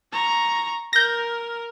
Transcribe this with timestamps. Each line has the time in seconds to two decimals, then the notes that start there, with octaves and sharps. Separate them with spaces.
0.12 A#5 C#6
0.93 A#4 G6 A#6